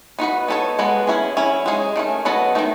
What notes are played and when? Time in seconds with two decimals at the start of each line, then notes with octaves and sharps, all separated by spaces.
0.19 B3 D#4 F#4 B4
0.48 B3 D#4 A4 C#5
0.79 G#3 B3 F#4 A4
1.07 C#4 E4 G#4
1.37 F#3 C#4 E4
1.66 G#3 D#4 G#4 C#5
1.96 D#3 A3 C#4
2.25 F#3 B3 F#4 A4 D#5
2.55 D#3 F#3 A3 D#4